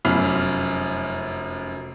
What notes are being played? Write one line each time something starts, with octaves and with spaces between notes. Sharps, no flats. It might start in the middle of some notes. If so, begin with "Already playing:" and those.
F1 F#2 F6